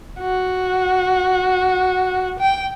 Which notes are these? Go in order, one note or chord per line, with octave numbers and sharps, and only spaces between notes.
F#4
G5